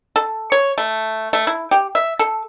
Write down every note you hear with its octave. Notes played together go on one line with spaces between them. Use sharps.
A4
C#5
A3
A3
E4
G4
E5
A4